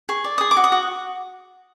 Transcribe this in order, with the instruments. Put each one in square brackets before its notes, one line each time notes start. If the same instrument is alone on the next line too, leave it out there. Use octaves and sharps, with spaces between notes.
[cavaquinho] G#4 C#6
D5
G#4 D#6
D6
F#4
D#6
F#4